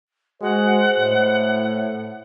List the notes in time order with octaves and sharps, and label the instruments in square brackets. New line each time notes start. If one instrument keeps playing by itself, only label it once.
[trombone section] G#3 F#4 [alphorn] C5 [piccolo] F#5
[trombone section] A2